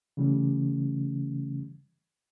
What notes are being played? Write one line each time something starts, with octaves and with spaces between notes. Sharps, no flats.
C#3 E3 G3 A3 C#4